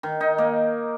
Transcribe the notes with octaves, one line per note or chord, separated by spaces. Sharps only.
D#3
D#4
A#3